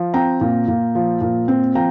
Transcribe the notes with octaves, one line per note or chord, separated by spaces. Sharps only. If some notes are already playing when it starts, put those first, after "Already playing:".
Already playing: F3
C4 G5 A#5
A#2
A#2
F3
A#2
C4
F3 G5 A#5